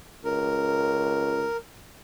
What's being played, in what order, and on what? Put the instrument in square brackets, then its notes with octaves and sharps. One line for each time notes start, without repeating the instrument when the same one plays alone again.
[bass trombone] C#2 [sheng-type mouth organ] A#4